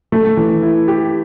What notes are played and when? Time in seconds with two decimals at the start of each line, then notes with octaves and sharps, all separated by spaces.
0.12 A3
0.37 E3
0.62 E4
0.88 G4